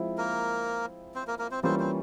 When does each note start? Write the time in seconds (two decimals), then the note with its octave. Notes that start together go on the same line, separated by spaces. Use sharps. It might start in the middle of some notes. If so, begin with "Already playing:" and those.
Already playing: F3 G#3 C4 E4
0.18 A#3 A#4
1.14 C4 C5
1.27 A#3 A#4
1.39 A#3 A#4
1.51 C4 C5
1.63 E3 G3 A#3 C4 C#4 F4 C5
1.79 C4 C5